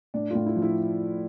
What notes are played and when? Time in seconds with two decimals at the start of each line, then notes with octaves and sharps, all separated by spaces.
0.14 A2 D4
0.31 A2 F4
0.46 E4
0.56 F3
0.62 E4